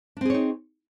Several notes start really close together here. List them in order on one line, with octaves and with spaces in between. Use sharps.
D4 C4 G#4 C#5 D#4